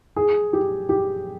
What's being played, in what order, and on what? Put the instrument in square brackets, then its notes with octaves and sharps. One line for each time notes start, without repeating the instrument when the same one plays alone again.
[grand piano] G#4
G4
G4